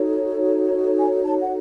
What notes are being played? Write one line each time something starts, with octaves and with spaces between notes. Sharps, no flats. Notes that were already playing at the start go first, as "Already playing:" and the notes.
Already playing: D#4 F#4 A4 C#5
G#5
A5
F#5